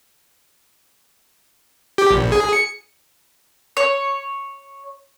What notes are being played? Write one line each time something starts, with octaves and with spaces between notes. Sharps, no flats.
G4
A#1
G#4
C#7
C#5